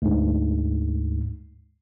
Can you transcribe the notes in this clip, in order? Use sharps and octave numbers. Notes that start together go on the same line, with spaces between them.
D2 G#2